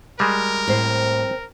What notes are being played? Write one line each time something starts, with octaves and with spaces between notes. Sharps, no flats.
G3 G#3 A#4
A2 C4 C5